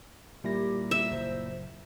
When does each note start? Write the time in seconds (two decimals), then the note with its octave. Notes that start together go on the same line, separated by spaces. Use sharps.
0.44 A#2 G3 E4 G4 A#6
0.91 E5
1.11 F#1 C5